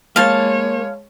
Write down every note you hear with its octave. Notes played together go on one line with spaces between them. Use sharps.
G#3 A#3 C#5 F5 A5